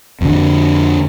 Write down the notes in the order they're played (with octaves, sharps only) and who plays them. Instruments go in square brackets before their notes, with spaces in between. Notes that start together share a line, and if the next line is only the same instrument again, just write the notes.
[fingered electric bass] F2 D3